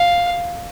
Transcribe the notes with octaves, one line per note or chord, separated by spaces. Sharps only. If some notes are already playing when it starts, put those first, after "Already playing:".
Already playing: F5